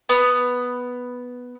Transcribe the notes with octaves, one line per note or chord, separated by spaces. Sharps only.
B3